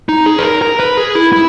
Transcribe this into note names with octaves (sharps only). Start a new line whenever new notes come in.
D#4
G#4
B4
A#4
A#4
B4
G#4
E4
E4